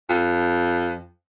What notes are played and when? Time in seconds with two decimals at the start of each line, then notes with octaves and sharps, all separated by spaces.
0.09 F2